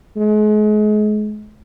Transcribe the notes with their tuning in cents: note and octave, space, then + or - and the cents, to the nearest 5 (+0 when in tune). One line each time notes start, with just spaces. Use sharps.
G#3 +35